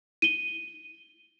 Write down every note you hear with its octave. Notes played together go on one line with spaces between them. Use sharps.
D#7 G7